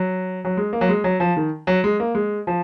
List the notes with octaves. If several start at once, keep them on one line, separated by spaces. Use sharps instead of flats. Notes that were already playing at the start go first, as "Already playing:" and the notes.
Already playing: F#3
F#3
G#3
A#3
F#3
G#3
F#3
F3
D#3
F#3
G#3
A#3
G#3
F3